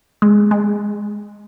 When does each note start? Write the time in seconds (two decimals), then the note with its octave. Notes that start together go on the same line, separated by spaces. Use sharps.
0.22 G#3
0.51 G#3